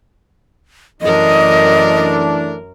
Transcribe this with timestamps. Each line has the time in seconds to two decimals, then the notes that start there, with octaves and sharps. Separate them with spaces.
1.02 F#2 E3 A3 D4 A#4 D#5